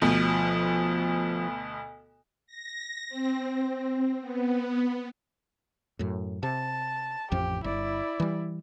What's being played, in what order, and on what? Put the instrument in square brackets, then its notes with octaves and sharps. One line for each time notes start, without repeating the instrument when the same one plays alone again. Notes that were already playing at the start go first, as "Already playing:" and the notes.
[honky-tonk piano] D2 B2 [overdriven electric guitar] F3
[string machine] A#6
C4
B3
[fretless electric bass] F#2 A2
[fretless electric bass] C3 [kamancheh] A5
[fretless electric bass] A1 F2 F3 [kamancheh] G4
[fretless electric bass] G1 [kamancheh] E4 D5
[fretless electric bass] E3 G3